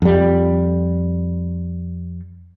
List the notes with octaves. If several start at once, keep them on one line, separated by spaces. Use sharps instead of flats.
F2 G3